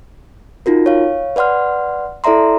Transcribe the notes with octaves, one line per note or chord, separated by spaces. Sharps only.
D#4 F4 F#4 A#4
C#5 F5
B4 D5 F#5 C6 F6
E4 A4 D5 E5 A#5 C6